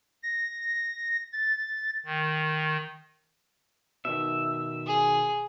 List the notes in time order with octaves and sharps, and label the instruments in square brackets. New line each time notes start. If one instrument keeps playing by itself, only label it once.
[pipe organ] A#6
A6
D#3
[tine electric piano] B2 D#3 [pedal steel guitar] E5
[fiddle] G#4